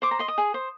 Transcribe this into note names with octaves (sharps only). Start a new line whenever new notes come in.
C5 D6
A#5
D#5 C6
D#6
G#4
C5